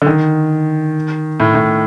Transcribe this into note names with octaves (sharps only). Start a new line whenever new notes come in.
D3
D#3
A2
A2